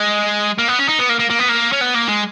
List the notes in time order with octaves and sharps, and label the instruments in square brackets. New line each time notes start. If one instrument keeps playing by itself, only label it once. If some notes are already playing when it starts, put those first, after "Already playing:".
Already playing: [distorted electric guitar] G#3
A#3
B3
C#4
D#4
B3
A#3
A#3
A#3
B3
A#3
C#4
B3
A#3
G#3